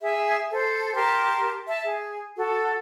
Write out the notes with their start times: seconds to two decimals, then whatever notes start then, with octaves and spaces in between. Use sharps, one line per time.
0.01 G#4 E5
0.51 A4 C5
0.95 G4 A#4 A5 C6
1.67 E5 A5
1.85 G#4
2.37 F#4 A4